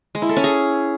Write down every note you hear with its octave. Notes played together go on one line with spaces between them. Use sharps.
G#3
E4
A4
C#4
G#4